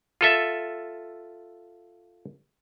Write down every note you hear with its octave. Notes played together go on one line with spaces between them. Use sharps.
F4 A4 E5